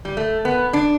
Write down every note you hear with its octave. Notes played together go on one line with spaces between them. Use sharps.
G3
A3
B3
D4